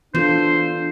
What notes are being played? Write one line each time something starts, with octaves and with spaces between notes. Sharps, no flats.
E3 B3 D4 F4 A4 C5